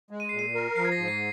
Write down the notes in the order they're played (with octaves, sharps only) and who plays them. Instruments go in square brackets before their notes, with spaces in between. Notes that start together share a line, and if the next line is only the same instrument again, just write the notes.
[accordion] G#3
[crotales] D#7
[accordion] A#2 [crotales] C7
[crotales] D#7
[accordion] A#4
[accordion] F3 [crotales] C7
[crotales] G#6
A#6
[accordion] G#2
[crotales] C7